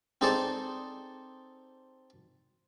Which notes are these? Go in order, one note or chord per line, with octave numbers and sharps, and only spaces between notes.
C4 D#4 G#4 A4 C5 D5